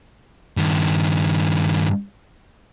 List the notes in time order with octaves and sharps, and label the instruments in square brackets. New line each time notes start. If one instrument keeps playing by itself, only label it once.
[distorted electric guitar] G2 D#3